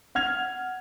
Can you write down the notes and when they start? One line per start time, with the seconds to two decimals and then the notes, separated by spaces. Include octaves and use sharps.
0.15 F#5 F6 G#6 F7